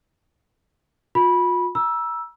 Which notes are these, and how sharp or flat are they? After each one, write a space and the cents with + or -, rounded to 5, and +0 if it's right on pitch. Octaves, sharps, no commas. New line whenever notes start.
F4 +40 B5 -15
A#5 +40 E6 +0